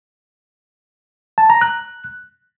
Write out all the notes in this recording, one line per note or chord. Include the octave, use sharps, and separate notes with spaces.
A5
A#5
F#6